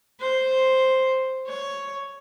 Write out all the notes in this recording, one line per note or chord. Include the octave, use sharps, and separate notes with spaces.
C5
C#5